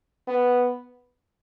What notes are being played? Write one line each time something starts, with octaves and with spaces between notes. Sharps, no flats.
B3